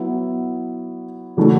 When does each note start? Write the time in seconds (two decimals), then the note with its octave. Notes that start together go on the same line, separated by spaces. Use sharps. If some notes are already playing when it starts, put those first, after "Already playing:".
Already playing: F#3 B3 E4
1.37 C#3 E3 A3 D4 F#4